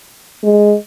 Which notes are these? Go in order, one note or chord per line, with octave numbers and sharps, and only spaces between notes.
G#3